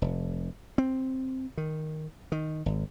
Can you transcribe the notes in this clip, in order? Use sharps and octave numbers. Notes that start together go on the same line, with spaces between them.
F1
C4
D#3
D#3
G#1